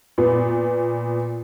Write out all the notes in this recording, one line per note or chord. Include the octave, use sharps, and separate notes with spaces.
A#2 B3